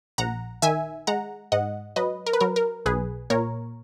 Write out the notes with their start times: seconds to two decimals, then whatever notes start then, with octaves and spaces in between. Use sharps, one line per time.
0.18 A#1 F#5 A#5
0.62 D#3 E5 G#5
1.07 G#3 F#5 A#5
1.52 G#2 D#5 F#5
1.96 F#3 B4 D#5
2.26 A#4
2.33 B4
2.40 F#3 A#4
2.56 A#4
2.86 B1 G#4 B4
3.30 A#2 A#4 C#5